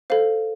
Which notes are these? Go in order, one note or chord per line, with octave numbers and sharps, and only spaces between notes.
A4 C5 F5